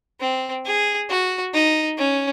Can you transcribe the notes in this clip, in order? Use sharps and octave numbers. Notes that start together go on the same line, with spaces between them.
C4
G#4
F#4
D#4
C#4